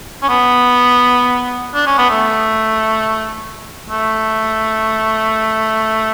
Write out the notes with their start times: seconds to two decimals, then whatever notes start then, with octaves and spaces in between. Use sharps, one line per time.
0.23 C#4
0.29 B3
1.75 D4
1.87 C#4
1.98 B3
2.09 A3
3.90 A3